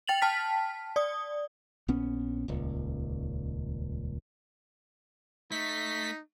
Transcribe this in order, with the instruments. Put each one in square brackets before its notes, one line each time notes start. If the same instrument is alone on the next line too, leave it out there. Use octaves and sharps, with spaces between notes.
[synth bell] G5 A6 F7 F#7
G5 A5 F6 B6
D5 D#6
[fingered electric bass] A#1 B3 C#4
D#1 C#2
[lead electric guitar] A3 [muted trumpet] D#4 [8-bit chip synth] B6